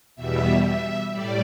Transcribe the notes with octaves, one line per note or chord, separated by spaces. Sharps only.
E2 B2 G3 E5
E5
A2 G3 D5